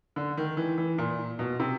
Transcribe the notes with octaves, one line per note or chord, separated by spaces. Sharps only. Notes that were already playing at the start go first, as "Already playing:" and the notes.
D3
D#3
E3
E3
A#2
B2
C3